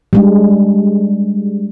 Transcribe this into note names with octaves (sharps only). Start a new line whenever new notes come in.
G3 G#3 D4